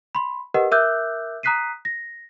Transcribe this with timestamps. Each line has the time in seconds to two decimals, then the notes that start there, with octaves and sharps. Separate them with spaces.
0.15 B5 C6
0.54 G4 A#4 B4 D#5 F#5
0.72 A#4 E5 D6 E6 F#6 G6
1.43 A#5 D#6 F#6 B6 C7 D#7
1.85 A#6